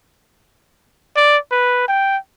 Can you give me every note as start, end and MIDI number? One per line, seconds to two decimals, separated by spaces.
1.16 1.37 74
1.51 1.84 71
1.88 2.17 79